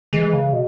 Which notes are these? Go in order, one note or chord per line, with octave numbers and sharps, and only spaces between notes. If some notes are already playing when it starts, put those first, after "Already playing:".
E3 G#3
C#3
B2